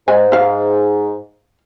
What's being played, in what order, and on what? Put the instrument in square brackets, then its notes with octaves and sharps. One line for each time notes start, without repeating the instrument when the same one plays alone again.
[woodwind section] G#2 [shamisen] G#3 G#5
[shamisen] E4 F5